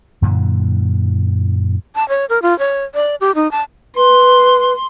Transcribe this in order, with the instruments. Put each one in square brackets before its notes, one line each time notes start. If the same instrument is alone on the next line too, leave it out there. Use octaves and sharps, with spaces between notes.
[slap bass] F#2 A#2 D3 E3
[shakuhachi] A5
C#5
A#4
F4
C#5
D5
G4
D#4
A5
[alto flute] B4 [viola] C6